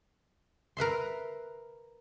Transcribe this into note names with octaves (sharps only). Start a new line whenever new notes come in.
A#4 B4 E5 C6